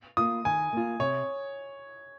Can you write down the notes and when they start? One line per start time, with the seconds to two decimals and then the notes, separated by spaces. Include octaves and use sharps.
0.17 A#3 F4 D#6
0.45 D#3 G#5
0.73 A#3 F4
0.99 C3 C#5